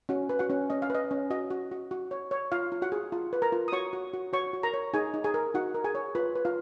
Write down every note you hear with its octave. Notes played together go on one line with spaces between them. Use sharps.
C#4 F#4 F#5
B4
F#4 F#5
C#4
C#4 D#5
F5
B4 D#5
C#4
F#4 D#5
F#4
F#4
F#4
C#5
C#5
F4 F5
F4
F#4 F#5
G#4
F4
B4
A#4 A#5
F4
D#6
F#4 C#5 C#6
F#4
F#4
F#4 C#5 C#6
F#4
A#4 A#5
C#5
D#4 G#4 G#5
D#4
G#4 G#5
A#4
D#4 F#4 F#5
A#4
G#4 G#5
C#5
F4 B4 B5
B4
F4 F5